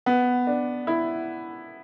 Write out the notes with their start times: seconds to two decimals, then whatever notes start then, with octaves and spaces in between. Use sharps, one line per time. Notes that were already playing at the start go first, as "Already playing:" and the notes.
0.06 B3
0.47 D4
0.87 E4